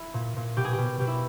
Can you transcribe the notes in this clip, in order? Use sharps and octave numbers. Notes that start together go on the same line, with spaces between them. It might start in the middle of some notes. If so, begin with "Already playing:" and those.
Already playing: E4
A#2
A#2
B2 G4
G#4
G4
B2
B2 G4
E4